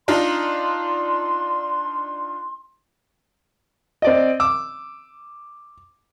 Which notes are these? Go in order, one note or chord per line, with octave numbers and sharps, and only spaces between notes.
D4 D#4 F4 C6
C4 D5 D#5
D6 E6